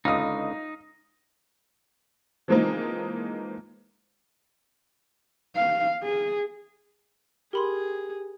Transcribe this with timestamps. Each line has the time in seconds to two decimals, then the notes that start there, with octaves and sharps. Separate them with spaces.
0.05 C#2 D3 D#4 F5 D#6
2.48 E3 F3 G#3 A#3 C4 D#4
5.56 F5
6.03 G#4
7.53 G4 G#4 A#4 B5 C6